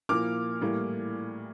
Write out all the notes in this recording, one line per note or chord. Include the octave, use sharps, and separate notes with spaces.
A#2 F3 A#3 E4 D6 F6
A2 E3 G3 A#3